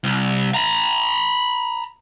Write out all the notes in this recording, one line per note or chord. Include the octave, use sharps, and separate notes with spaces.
C2
A#5 B5